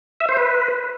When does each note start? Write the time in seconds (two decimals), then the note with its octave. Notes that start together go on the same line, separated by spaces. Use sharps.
0.20 E5
0.29 C5
0.37 B4